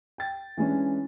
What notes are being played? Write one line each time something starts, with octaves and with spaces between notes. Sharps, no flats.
G5 A6
E3 G#3 C#4 D4